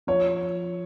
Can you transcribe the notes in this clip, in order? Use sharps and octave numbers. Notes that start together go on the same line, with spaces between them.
F3 C#5